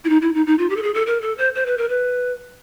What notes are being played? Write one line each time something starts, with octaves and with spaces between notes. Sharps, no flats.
E4
D#4
E4
D#4
D#4
F4
G4
A4
G#4
A4
A#4
A4
C5
C5
B4
A#4
B4